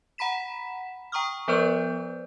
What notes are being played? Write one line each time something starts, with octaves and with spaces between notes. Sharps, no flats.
F#5 A#5 B5 B6 E7
G5 A#5 C#6 D#6 F6
F3 B3 B4 C5 D5 G6